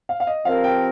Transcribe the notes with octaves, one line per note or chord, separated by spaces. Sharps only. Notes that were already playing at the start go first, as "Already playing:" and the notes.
F5
F5
D#5
F3 C4 G4 A#4 F5
G5